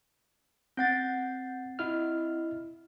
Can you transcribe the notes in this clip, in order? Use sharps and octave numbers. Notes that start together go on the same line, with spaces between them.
C4 F#5 G6 A6
E4 D#5 F6